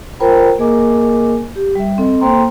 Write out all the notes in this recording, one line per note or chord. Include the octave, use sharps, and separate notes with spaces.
F4 A#4 C5 G5 A#5 B5
A#3 G#4 A#4 D#5 G#5 D6
G4
G3 E5
C4 A4 D#5
A#3 A4 C5 G5 A#5 C6